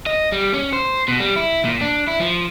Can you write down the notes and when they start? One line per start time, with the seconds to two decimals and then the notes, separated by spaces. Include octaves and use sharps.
0.06 D#5
0.32 G3
0.54 C#4
0.73 C5
1.08 B2
1.20 G3
1.36 E4
1.65 A#2
1.81 D4
2.07 E4
2.20 F3